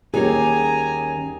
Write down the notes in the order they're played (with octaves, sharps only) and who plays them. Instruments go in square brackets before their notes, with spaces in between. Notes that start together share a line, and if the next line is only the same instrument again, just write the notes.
[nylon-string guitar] D#2 C#4 C#5 [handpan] G4 [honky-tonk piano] G#4 [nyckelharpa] G#5 A#5